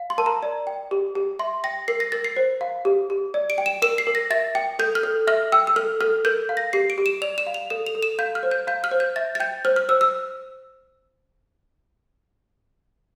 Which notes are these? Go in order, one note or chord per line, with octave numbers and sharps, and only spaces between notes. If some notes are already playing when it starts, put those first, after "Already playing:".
Already playing: F5
C6
A#4 A5
A#5
D5
G5
G4
G4
E5 C6
G5 A#6
A#4 C7
A#6
A#4 A6
C7
C5
F5
G4
G4
D5
D7
G5
E7
A#4 E7
C7
A#4
A#6
E5 A6
G5
A4 G6
F6
A4
E5 F6
G5 E6
E6
A4 F6
A4 F6
A#4 G6
F5
A#6
G4 C7
D7
G4
E7
D5 F7
E7
F5
F7
A4 E7
F7
A4
E7
F5 G6
F6
C5
G6
F5 G6
F6
C5
G6
E5 A6
A6
G5 G6
C5 F6
F6
C5 E6
E6